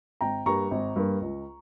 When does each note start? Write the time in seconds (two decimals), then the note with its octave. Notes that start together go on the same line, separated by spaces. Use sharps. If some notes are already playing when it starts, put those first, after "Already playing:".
0.21 G#1 G5 A#5
0.46 G2 G3 A#3 A#5 C#6
0.71 G#1
0.96 G2 G3 A#3
1.21 C#2